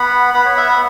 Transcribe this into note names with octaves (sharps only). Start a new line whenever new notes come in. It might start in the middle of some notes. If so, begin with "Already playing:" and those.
Already playing: B3 F#5 B5
B3 F#5 B5
C#5
E5
F#5